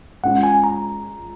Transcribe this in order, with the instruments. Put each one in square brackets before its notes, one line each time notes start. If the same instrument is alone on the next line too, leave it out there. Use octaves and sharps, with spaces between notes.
[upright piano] G#3 C#4 F4 [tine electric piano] F#5
[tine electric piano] G#5
A#5